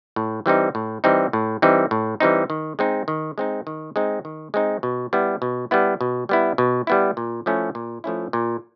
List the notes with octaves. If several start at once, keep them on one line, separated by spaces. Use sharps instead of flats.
A2
E3 G3 C4 D#4
A2
E3 G3 C4 D#4
A2
E3 G3 C4 D#4
A2
E3 G3 C4 D#4
D#3
G#3 C4 D#4
D#3
G#3 C4 D#4
D#3
G#3 C4 D#4
D#3
G#3 C4 D#4
B2
G3 B3 E4
B2
G3 B3 E4
B2
G3 B3 E4
B2
G3 B3 E4
A#2
F3 A3 C#4 E4
A#2
F3 A3 C#4 E4
A#2